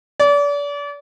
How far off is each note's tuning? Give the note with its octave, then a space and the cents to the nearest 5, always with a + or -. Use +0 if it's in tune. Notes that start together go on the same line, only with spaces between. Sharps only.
D5 -35